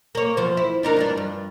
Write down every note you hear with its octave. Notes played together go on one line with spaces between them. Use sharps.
A#3 C#5
E2 F3 C5
E4
D4 D#4 A#4
G2 E3 D4
G2